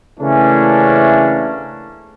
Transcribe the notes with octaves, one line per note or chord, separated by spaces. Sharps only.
C#3 E3 A3 A#3 C#4 D4